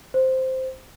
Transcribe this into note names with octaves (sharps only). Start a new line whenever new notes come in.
C5